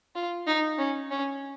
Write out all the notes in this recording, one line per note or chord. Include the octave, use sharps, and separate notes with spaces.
F4
D#4
C#4
C#4